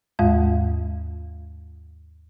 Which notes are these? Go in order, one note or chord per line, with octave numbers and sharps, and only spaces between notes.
D#2 G#2 G#3 F4 F5